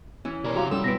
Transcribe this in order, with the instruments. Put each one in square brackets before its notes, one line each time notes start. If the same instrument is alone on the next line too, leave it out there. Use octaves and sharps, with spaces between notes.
[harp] E3 C#4 E4
[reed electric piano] B2 [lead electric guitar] G3 A#4 [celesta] C#5 D5
[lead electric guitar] C3 A#5 [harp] F3 F#3 [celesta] F#4 F5 D6 [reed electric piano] G4
[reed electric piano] F#2 C#4 G5 [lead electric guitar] G3 [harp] E4 E6 [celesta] A4
[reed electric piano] B2 B3 B4 [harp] C4 [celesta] A#6 B6 D7